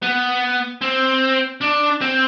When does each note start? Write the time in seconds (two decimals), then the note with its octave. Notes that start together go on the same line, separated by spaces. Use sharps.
0.02 B3
0.82 C4
1.61 D4
2.01 C4